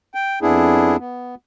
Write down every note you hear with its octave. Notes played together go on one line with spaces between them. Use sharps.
G5
F2 B3 D4 E4 G#4
B3